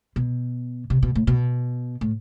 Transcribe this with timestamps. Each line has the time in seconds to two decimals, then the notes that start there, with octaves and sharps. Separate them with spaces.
0.16 B2
0.90 C3
1.03 B2
1.15 A2
1.27 B2
2.01 A2